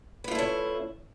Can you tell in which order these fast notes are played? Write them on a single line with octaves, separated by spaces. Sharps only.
B4 F4 A3 E4 C#4